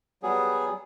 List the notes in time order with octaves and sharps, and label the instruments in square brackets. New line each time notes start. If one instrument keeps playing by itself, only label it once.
[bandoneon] F#3 G3 B3 G#4